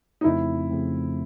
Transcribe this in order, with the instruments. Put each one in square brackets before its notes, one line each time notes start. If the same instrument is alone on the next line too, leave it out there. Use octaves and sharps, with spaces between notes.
[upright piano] D#4
[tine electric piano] F2 C#3 F3 A3 C4 [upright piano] E4
[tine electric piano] F2 C#3 F3 A3 C4